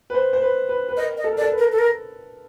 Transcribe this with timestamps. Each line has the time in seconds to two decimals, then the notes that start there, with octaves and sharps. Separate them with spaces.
0.10 B4
0.14 C5
0.33 C5
0.42 B4
0.69 B4
0.89 B4
0.97 A#4 D#5
1.17 D#5
1.24 A4
1.33 A#4
1.38 D5
1.41 A4
1.52 B4
1.58 A#4
1.72 A4
1.79 A#4